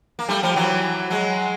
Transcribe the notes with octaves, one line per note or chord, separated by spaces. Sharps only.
A#3
G3 A3
F3 G3
E3 F#3
F#3 G#3